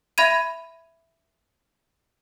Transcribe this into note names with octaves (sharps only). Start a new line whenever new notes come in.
E5 B5 G#6 D#7